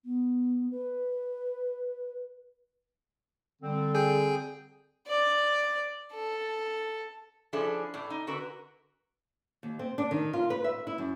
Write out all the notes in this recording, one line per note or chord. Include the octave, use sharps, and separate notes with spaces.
B3
B4
D3 G3 C4
G#4 G5
D5
A4
F3 C#4 D4 E4 G#4 A4
A2 D5
D#4
D3 F#4 A#4 B4 A#5
D#2
C4
D4
D#3
F4
B4
E5
E4
F#2